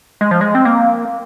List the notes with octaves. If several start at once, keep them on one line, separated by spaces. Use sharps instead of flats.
G#3
F3
G#3
C4
A#3